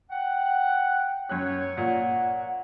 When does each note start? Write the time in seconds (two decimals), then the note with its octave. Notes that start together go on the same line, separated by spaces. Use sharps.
0.10 F#5 G5
1.29 F#2 C#5 F#6
1.77 A#2 F#5